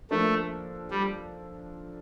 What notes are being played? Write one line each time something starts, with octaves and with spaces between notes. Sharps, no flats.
F3 A3 A#3 D4 A4
G3